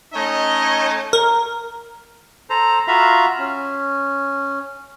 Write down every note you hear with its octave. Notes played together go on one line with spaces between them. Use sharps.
A3 C#4 D#4 C#5 D#5
A#4
A4 C5 A#5
F4 F#4 E5 F5 A#5 B5
C#4